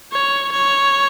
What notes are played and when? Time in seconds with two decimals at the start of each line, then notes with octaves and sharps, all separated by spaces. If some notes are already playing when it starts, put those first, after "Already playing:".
0.13 C#5
0.52 C#5